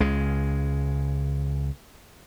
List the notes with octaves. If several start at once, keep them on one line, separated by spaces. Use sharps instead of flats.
C#2 C#3 G#3